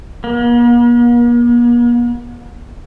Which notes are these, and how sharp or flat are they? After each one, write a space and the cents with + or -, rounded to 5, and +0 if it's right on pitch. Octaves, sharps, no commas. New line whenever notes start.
A#3 +45